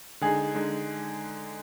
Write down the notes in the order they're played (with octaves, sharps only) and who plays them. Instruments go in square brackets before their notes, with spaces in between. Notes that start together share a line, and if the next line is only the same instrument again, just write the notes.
[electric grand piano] D3 G#3 D#4 [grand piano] G#4
[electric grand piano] D3 G#3 D#4